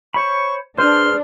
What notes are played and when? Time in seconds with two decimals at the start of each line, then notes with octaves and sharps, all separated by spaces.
0.14 C5 C#5 B5 C#6
0.78 D4 G#4 B4 C5 C6 F6